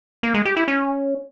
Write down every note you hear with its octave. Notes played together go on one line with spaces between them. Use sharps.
A#3
G#3
G4
E4
C#4